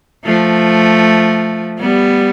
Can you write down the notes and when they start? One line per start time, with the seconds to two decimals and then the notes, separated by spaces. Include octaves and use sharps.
0.25 F3 A3
1.79 G3 B3